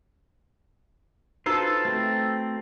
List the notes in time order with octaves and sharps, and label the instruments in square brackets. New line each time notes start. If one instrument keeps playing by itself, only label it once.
[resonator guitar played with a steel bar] D#4 B4 C5 [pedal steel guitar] F4 A4 [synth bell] F#4 E6 C7
[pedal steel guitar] A3 C4